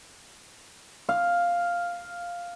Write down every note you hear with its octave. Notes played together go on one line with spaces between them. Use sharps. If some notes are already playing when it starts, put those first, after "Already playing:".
F5